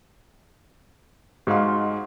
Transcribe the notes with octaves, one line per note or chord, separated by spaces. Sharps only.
G#2 G#3 F#4 F5 C6